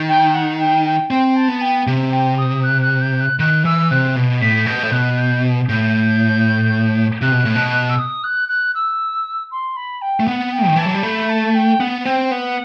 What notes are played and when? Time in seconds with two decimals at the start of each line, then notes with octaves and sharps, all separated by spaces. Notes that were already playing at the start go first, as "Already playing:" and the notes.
Already playing: D#3
0.08 G5
0.34 F#5
0.59 G5
0.85 G5
1.10 C4 G5
1.36 A5
1.48 B3
1.61 G5
1.87 C3
2.12 G5
2.37 D#6
2.63 F#6
2.82 F#6
3.01 G6
3.20 F#6
3.39 D#3 F#6
3.65 E3 E6
3.91 C3 F#6
4.16 B2
4.41 A2 B6
4.66 B2 G6
4.83 A2
4.92 B2 F#6
5.18 G6
5.68 A2 G6
7.21 C3 F#6
7.32 B2
7.45 A2
7.56 B2
7.89 E6
7.98 D#6
8.23 F#6
8.48 F#6
8.74 E6
9.51 C6
9.76 B5
10.01 G5
10.20 A3
10.27 B3 F#5
10.52 G5
10.67 D#3
10.76 E3 A5
10.86 F#3
10.94 G3
11.03 A3 B5
11.29 A5
11.54 G5
11.80 B3 F#5
12.05 C4 G5
12.31 B3 F#5